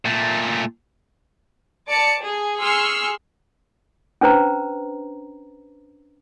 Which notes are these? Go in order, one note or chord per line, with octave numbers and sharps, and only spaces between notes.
A#2 A3
D5 A5 D6 C#7
G#4
G#4 C6 C#6 E6 F6
C#4 D4 B4 C5 A#5